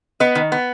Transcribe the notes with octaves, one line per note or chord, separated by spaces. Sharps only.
B3 B4 D#5
D#3
B3